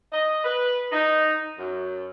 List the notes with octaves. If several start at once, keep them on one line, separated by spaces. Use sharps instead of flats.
D#5
B4
D#4
F#2